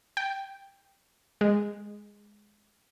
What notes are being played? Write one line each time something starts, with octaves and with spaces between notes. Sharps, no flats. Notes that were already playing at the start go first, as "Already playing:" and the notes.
G5
G#3